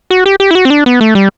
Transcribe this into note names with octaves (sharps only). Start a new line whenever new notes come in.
F#4
G4
G4
E4
F#4
C4
D4
B3
A3
G3